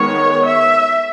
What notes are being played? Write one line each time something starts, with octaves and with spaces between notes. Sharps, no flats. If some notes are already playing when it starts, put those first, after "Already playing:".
Already playing: D#3 G#3 B3 C#5
E5